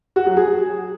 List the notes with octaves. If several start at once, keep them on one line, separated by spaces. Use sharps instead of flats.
F#4
F#3
G#4